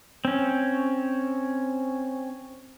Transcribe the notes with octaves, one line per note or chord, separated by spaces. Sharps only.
C4 C#4